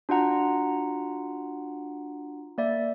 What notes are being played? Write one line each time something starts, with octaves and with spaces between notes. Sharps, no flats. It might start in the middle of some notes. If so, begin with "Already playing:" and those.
D4 F4 F#4 F#5 A#5
A#3 D5 E5